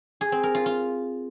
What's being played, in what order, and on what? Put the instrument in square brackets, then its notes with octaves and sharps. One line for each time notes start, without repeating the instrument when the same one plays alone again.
[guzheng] G#4
C4
A#4
F4
F4